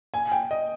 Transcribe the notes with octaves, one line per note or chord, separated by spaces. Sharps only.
G#5
G5
D#5